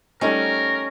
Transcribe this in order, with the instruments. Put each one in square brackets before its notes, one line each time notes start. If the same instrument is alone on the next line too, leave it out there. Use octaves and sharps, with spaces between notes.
[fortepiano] G3 A3 D#4 [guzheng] C#4 [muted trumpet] A#4